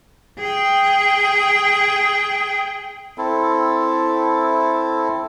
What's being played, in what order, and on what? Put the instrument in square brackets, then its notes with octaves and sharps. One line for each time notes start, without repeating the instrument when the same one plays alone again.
[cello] G#4 G5
[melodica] C4 E4 A4